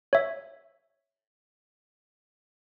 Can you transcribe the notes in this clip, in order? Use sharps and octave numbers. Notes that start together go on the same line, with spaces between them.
C#5 E5